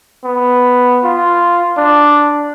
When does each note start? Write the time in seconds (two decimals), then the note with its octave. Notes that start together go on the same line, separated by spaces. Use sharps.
0.24 B3
1.04 F4
1.78 D4